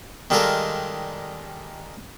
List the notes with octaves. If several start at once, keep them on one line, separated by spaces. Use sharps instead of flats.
D#3 G3 G#3 F4 A4 A#4